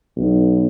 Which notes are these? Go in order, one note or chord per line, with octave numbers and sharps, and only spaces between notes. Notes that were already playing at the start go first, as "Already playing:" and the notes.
B1